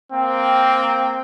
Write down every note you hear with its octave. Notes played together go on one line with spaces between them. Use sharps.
A#3 C4 G5